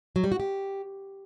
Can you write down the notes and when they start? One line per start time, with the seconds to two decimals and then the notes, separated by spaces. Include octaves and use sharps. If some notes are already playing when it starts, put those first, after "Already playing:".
0.16 F#3
0.24 G3
0.32 F#4
0.40 G4